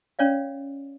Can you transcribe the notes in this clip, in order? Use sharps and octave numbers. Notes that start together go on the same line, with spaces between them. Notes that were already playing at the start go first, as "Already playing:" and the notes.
C#4 C#5 D5 F5